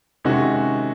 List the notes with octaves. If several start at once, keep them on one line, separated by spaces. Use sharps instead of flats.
C3 D#3 G#3 C#4 F#4